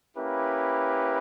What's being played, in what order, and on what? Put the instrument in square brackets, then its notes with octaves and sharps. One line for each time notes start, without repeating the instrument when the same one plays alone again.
[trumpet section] A#3 C#4 E4 G4 B4